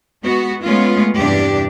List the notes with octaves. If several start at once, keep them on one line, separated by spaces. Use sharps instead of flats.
G#3 B3 F#4
G#3 A3 B3 C#4 F4
E2 G2 C3 D4 G4